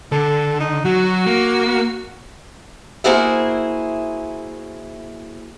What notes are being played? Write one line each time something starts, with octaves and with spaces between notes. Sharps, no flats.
D3 A4
D#4
F#3 F#4
A#3
A#3 E4 F#4 G#4 C5 E5